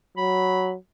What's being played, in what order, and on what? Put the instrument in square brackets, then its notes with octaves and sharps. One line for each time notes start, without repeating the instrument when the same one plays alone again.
[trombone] F#3 [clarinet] B5